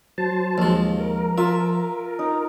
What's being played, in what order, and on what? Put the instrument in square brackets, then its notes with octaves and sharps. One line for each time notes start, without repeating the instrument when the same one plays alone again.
[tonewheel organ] F#3 C5 A5
[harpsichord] D#2 G#3 [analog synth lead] F3
[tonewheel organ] A#4
[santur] F4 [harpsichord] E5
[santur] D#4